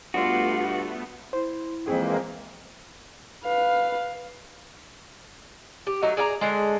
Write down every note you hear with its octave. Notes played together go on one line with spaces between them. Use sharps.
G2 A3 B3 F4 F#4 D5
E4 C5
F2 E3 G#3 A#3 G#4
B4 F5
G4
F#3 A3 D#4
G#4 D5 F5 A#5
D3 G#3